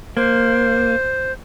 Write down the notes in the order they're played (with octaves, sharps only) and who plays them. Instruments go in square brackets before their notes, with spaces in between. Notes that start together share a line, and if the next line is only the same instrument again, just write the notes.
[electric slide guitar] A#3 [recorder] C5